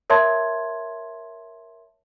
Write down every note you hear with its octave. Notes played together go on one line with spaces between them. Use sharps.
A#4 C#5 E5 A5 C6 G#6